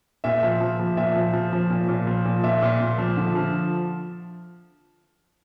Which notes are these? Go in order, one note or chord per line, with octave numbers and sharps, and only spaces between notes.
A#2 E5
F3
F3
F3
A#2 E5
F3
F3
F3
A#2
A#2
F3
A#2
A#2 E5
A#2
A#2
F3
D3
F3